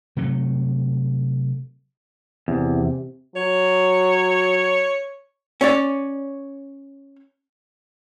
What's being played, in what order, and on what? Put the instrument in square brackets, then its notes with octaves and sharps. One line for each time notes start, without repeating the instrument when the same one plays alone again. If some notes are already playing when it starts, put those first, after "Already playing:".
[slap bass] C3 F#3 A3
[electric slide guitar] E2 [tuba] C3
[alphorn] F#3 [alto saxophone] C#5
[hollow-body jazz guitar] C#4 C#5 D5